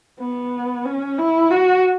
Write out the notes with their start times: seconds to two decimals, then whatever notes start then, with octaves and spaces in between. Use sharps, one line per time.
0.20 B3
0.85 C#4
1.18 E4
1.51 F#4